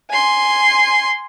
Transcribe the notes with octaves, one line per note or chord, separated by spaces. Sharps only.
G#5 C6